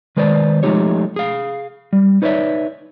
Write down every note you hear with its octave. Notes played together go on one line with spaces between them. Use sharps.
D#3 G#3 B4 C5 D5
F3 G#3 A3 D#4 G4 C#5
G#4 F5
G3
D#4 B4 C#5 D5 E5